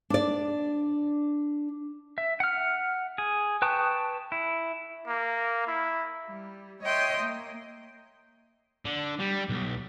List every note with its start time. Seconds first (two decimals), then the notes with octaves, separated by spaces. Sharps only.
0.10 D4 D5
2.18 E5
2.40 F#5 F6
3.18 G#4
3.62 B4 G5 A5 C#6 D#6
4.32 E4
5.07 A#3
5.67 E4
6.28 G3
6.83 C#5 D#5 E5 G5 C6 D#6
7.21 A#3
8.85 D3
9.19 G3
9.49 B1